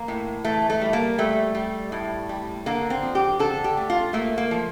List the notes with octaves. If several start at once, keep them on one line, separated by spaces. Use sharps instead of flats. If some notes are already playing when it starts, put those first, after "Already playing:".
Already playing: A#3
A2
E3 A3
A3
G3
A#3
G3 A3
G3
A2
G3
D3 A#3
C4
F3
G4
D3 A4
G4
A3
F4
A3 A#3
A#3
F3